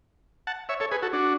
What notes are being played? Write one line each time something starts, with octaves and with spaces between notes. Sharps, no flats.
F#5 A5
C#5 E5
A4 C#5
G#4 B4
F#4 A4
D4 F#4